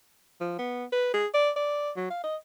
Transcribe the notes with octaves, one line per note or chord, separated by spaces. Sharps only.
F3
B3
B4
G#4
D5
D5
F#3
F5
D#5